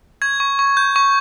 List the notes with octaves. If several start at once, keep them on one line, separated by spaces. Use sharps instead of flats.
C#6 G#6
C#6
C#6
G6
C#6